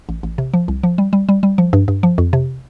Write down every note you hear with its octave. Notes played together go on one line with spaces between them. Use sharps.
A1
A1
C3
F3
C2
F3
G3
G3
G3
G3
F3
G2
G2
F3
F2
C3